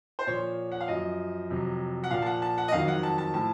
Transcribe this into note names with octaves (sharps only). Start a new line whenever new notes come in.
C5
A#2 F3 C#5
F#5
F5
F#2 F3 D#5
F2 C3 F#3
F#5
A#2 F3 F5
A5
F#5
A5
F#5
D#5
F2 D#3 F#3 F5
F#5
A5
A5
A2 F3 A5